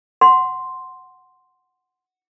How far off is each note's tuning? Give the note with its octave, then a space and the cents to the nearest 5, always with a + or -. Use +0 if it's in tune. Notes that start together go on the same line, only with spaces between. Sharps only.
F#5 +0 C6 +0